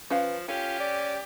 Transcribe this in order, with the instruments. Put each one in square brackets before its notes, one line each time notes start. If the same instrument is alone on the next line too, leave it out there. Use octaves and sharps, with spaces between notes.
[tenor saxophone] F3 [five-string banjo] C#4 B4 F5
[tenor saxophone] C#4 [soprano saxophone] F4 [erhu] G4 [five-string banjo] A4
[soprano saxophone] D5